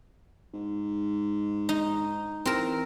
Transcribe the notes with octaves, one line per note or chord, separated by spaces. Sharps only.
G#2
D#4
E3 C4 A#4